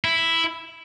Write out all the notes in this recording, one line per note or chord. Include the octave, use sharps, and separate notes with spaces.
E4